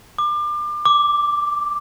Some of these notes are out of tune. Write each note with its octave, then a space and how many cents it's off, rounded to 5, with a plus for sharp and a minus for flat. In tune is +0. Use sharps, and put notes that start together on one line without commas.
D6 +30
D6 +0